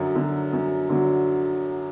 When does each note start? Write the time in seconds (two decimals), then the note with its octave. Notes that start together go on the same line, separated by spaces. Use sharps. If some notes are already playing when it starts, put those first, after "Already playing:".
Already playing: F#2 D3 F#3
0.15 D3 F#3
0.53 F#2
0.89 D3 F#3